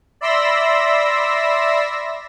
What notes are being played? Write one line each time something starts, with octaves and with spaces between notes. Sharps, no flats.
D5 E5 B5 C6 E6 A#6